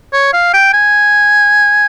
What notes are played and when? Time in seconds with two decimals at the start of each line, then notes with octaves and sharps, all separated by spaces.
0.13 C#5
0.33 F5
0.54 G5
0.73 G#5